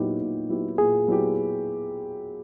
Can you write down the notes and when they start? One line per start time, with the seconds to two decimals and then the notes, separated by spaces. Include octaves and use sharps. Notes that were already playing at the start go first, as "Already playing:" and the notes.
Already playing: A#2 F#3 B3 D#4 E4 G4
0.21 A#2
0.49 F#3 B3 E4 G4
0.78 A#2 G#4
1.08 F#3 B3 E4 G4